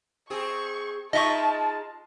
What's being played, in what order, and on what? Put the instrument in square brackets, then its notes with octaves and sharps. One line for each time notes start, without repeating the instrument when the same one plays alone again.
[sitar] C4 G#4 [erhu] C#6
[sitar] G#3 D#4 F4 [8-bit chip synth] D#5 E5 C#6 [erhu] A5